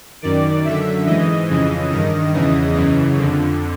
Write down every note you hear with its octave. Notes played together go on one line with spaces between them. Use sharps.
F#2 D#3 D5
F#2 D3 E5
G#2 E3 D#5
F2 C#3 E3
G2 D#3 D#5
E2 C#3 E3 D#5
F#2 C#3 E3
F2 D3